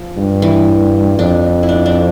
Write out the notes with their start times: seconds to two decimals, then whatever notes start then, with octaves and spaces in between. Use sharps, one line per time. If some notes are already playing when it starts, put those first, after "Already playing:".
Already playing: F3
0.17 G2
0.42 E3
1.18 F2 D4
1.63 E4
1.69 D4
1.86 D4